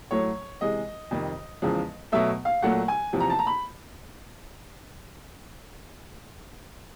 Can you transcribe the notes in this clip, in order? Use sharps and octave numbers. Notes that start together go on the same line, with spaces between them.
A2 F#3 A3 C#5
C3 E3 G#3 D#5
F2 C3 D#3 G3
E2 C#3 F3 G#3
B2 F#3 A3 E5
F5
A#2 F#3 A3 F#5
G#5
E2 C3 F3
A#5
A5
A#5
B5